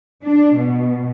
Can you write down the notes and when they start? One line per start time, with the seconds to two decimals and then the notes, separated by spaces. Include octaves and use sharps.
0.23 D4
0.56 B2